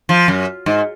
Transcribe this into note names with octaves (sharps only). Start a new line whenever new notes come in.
F3
F#2
G#2